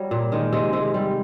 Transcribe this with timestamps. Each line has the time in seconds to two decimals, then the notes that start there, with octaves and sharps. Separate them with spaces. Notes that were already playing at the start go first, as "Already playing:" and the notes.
Already playing: F#3 G3
0.11 A#2
0.32 D#3 G#3
0.53 C3 G#3
0.73 C3 G#3
0.94 G3